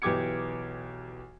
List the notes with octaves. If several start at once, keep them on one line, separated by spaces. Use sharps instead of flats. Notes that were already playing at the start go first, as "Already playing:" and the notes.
B1 E3 G4 D6 G#6 C#7